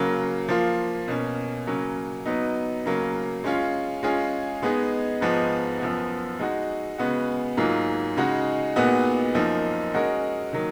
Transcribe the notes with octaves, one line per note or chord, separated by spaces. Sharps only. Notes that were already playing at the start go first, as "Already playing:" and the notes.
Already playing: C#3 F#3 A#3
F3 A#3 F4
B2 A#3 C#4
C#3 F#3 A#3 C#4
F#3 B3 D#4
C#3 F#3 A#3
G#3 C#4 F4
G#3 C#4 F4 G#4
G#3 B3 D#4 G#4
G#2 F3 G#3 B3 D#4
F#2 F3 B3
G#3 D#4 F#4
C#3 G#3 B3 F#4
G#2 F#3 A#3 F4 G#4
C#3 G#3 D#4 F#4
A#2 G#3 B3 D#4 F#4
F#2 F3 A#3 D#4
G#3 C#4 F#4 A#4 D#5
D#3 F#3 A#3